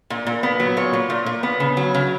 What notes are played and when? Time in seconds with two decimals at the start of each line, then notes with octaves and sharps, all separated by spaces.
0.10 A#2
0.27 A#2
0.43 B3
0.60 F#3
0.77 A#2 C#5
0.93 A#2
1.10 A#2
1.26 A#2
1.43 B3
1.60 C#3
1.77 F#3
1.94 C#3